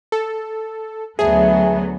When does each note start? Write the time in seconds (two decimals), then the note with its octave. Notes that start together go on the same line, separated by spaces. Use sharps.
0.12 A4
1.19 D2 F#3 B3 G#4 E5 G#5 A5